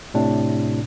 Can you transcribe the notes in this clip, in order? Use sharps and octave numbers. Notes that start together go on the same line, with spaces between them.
A2 C3 D4